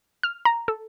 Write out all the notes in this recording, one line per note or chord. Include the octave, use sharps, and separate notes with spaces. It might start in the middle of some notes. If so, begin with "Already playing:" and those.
F6
A#5
A4